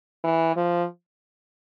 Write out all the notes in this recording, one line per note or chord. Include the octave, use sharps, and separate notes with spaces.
E3
F3